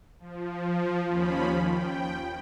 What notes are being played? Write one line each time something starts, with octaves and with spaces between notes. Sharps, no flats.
F3
D#2 F3 C#4 B5
G5